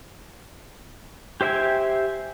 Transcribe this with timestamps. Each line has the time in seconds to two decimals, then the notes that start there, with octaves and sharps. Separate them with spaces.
1.41 G4 C5 E5 G5 G#5